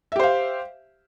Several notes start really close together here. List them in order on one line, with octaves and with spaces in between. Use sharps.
E5 G4 C5 F5